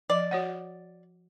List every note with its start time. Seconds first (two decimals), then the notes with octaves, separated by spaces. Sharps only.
0.10 F3 D5 D#5
0.31 F#4 C#5 F#5